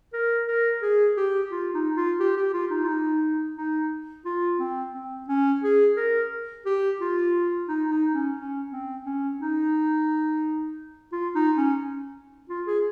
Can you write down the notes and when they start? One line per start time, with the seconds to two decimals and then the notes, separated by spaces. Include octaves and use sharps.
0.13 A#4
0.48 A#4
0.82 G#4
1.17 G4
1.51 F4
1.74 D#4
1.97 F4
2.20 G4
2.37 G4
2.54 F4
2.71 D#4
2.84 F4
2.88 D#4
3.57 D#4
4.25 F4
4.59 C4
4.94 C4
5.29 C#4
5.64 G#4
5.97 A#4
6.66 G4
7.01 F4
7.69 D#4
7.91 D#4
8.14 C#4
8.37 C#4
8.72 C4
9.06 C#4
9.41 D#4
11.12 F4
11.35 D#4
11.57 C#4
12.50 F4
12.67 G#4